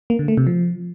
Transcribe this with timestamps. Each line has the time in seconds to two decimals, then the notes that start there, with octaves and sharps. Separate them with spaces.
0.10 A#3
0.19 D3
0.28 A3
0.37 C3
0.47 F3